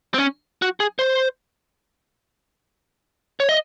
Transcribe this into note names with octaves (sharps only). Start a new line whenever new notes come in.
C4
C#4
F#4
G#4
C5
C#5
D#5